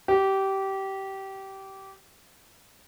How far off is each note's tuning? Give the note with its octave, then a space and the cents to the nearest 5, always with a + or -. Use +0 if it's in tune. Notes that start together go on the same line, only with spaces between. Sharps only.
G4 -20